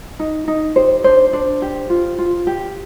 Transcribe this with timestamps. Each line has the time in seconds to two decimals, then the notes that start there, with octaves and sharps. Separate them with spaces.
0.19 D#4
0.48 D#4
0.76 G4 C5
1.04 D4 C5
1.33 D4 C5
1.62 G4
1.90 F4
2.18 F4
2.47 G4